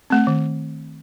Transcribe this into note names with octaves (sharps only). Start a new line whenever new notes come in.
A3 C4
D#3